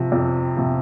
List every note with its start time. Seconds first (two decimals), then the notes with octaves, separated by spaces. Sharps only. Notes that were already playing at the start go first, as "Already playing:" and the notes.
Already playing: C3 F3
0.12 F2
0.57 C3 F3